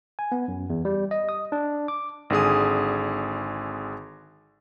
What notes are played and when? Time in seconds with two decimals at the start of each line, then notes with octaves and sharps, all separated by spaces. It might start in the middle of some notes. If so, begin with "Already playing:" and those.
0.19 G#5
0.32 B3
0.48 F#2
0.70 E2
0.85 G3
1.11 D#5
1.29 D#6
1.52 D4
1.88 D6
2.30 G#1 D3 G#4 D#6